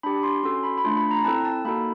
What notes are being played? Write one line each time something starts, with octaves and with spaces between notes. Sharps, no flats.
D4 G4 B5
C6
C#4 F#4 A4 C6
B5
B5
A3 D4 F4 C6
B5
A#5
C4 E4 A4 A5
A5
A#3 D#4 F#4 A4 B5